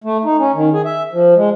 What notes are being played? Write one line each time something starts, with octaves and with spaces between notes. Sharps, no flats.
A3
D#4
C#4
D#3
G#4
E5
F3
G#3